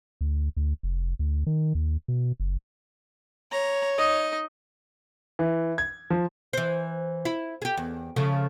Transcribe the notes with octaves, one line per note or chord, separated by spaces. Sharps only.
D2
D2
F1
D2
D#3
D#2
B2
F#1
C#5 A#5
D#4 D#5
E3
G#6
F3
E3 C5
E4
G4 G#4
E2
C#3 F3 A3